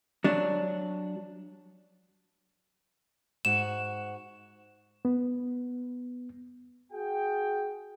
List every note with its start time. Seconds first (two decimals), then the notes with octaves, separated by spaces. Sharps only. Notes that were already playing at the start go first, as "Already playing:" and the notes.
0.24 F#3 D4
3.45 G#2 F#4 E7
5.05 B3
6.92 F#4 G#4 G5